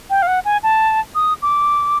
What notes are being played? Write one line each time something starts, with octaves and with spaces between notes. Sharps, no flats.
G5
F5
F#5
G#5
A5
D#6
D6